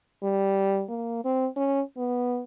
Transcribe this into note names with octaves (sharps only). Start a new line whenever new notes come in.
G3
A#3
C4
C#4
B3